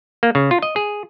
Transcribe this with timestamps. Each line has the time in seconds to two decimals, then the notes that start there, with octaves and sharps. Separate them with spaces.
0.23 A#3
0.35 C#3
0.51 F4
0.62 D#5
0.76 G#4